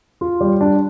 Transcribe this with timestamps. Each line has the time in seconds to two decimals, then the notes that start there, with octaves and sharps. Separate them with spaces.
0.21 F4
0.41 G3
0.61 D4